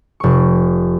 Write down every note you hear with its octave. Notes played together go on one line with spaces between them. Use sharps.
F1 C#6